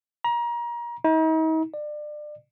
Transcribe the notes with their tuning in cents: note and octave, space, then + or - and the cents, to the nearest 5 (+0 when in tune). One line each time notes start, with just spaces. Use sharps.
A#5 +30
D#4 +40
D5 +30